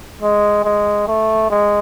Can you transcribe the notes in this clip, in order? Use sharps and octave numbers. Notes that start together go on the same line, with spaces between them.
G#3
G#3
A3
G#3